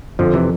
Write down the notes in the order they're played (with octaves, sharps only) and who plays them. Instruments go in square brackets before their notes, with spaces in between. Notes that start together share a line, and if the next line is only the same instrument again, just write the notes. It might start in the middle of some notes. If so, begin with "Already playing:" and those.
[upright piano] F2 [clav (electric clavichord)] D3 F3
[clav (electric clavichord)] C3 E3